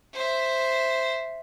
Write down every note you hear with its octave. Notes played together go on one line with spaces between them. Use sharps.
C5 E5